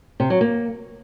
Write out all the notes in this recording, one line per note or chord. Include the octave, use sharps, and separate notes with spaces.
C3
F#3
A#3